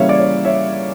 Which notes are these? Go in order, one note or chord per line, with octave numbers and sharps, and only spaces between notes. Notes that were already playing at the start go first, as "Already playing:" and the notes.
Already playing: C#3 E3 G3 A#3 C#5 E5 F5
D5
C#5
C#5 E5